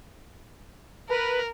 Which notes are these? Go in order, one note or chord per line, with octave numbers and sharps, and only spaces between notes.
A#4 B4